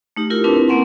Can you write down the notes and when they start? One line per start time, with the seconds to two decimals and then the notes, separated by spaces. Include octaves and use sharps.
0.16 A3 D#4 G4
0.30 E4 F4 G4 A#4
0.44 C4 D4 E4 A#4 B4 A5
0.68 A#3 C4 C#4 F#5 G#5 C6